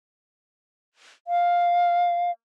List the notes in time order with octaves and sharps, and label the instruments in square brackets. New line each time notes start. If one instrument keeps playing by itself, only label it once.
[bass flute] F5